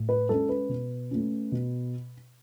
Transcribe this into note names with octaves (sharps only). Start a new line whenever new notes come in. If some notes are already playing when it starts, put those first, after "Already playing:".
Already playing: A2
B4
G#3 C#4 A4
B4
B2
A3 C#4
B2